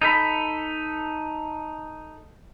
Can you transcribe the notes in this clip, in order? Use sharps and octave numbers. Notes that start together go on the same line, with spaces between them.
D#4 A4 B5